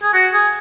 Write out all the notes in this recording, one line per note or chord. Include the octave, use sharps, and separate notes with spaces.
G#4
F#4
G#4